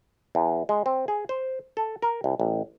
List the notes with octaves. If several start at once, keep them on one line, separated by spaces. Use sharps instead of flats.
E2
G#3
C4
G#4
C5
A4
A#4
C2
A1